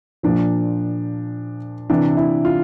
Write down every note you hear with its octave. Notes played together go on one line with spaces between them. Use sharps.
A#2 F3 D4
C3 E3 D4
E4
F4